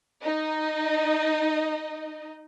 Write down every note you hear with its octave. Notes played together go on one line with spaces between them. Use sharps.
D#4 D#5